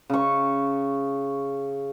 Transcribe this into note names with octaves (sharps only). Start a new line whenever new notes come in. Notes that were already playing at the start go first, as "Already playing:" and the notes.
C#3 C#6